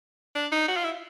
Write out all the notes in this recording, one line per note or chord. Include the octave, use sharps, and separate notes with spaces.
D4
D#4
F#4
F4
E4